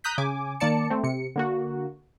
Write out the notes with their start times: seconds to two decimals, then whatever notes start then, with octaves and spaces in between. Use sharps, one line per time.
0.04 A#5 D#6 F#6 G6 B6
0.18 C#3 G#5 D6
0.60 D#3 A#3 D5 A5 C#7
0.90 A3 C4
1.03 C3 C#7
1.36 D3 A#3 F#4